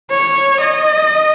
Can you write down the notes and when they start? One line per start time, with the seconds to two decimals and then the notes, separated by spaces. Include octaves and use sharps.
0.11 C#5
0.60 D#5